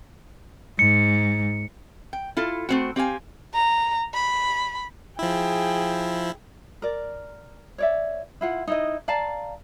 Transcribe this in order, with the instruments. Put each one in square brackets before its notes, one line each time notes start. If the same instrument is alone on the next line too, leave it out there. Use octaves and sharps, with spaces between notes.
[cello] G#2 [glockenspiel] C#7
[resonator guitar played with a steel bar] G5
E4 F4 A4
A3 C4 F#4
C4 G4 F5 G#5
[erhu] A#5
B5
[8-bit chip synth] F3 E4 [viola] G#4 G5
[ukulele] A#4 D5
C#5 D5 E5
E4 F4 F#5
D#4 E4 D#5
D5 F5 A5 A#5